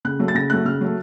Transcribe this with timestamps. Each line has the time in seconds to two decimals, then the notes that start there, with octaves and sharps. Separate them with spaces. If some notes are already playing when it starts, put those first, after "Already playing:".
0.05 C#3 F#6
0.19 F#3 A3
0.28 A6
0.35 C#3 A#6
0.50 F#3 A3 F#6
0.65 C#3 F6
0.81 F#3 A3